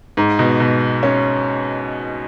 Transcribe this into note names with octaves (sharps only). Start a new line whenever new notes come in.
G#2
B2
B2
C#4